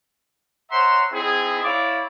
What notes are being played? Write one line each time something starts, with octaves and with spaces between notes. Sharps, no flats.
C5 C#5 E5 F#5 A#5 C6
C4 D#4 E4 G#4
E4 C#5 D5 F5 D6